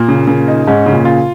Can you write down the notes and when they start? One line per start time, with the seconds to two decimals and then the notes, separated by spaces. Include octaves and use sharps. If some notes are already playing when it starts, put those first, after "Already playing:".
Already playing: A#2 A#3
0.08 C#3
0.27 C#3
0.48 D#4
0.67 G#2 C#4
0.86 C#3
0.93 A#2
1.05 F4